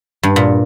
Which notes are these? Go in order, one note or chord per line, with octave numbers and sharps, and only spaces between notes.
G2
A#2